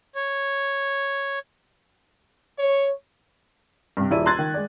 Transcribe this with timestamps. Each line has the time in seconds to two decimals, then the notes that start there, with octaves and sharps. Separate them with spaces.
0.15 C#5
2.58 C#5
3.97 G2 C3
4.11 D#1 E4 G#4 D5 D#7
4.26 A#5 C6 E6 F#6 G#6 A6
4.39 D#3
4.54 G#3 D5